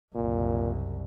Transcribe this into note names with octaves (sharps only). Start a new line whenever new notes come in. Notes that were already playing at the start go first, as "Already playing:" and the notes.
F#1 C2 A#2